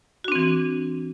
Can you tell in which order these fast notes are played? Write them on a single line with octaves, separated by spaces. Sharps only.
F#4 D4 C4 E3